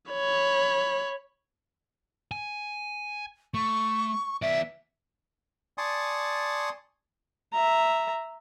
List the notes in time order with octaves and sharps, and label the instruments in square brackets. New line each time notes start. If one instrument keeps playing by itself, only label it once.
[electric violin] C#5 B5
[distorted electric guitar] G#5
[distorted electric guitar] A3 [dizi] C#6
[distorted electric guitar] B3 D5 [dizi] E5
[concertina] D5 G#5 A5 C6 C#6 D#6
[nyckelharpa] E5 A#5